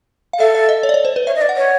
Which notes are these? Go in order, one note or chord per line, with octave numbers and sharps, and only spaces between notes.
F5
A4 E5
E5
D#5
C#5
D5
C#5
C5
B4
C#5 E5
D#5
D5
F#5
C#5